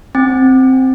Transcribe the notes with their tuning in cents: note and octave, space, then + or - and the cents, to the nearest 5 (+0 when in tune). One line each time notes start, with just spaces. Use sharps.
C4 +0 G5 +40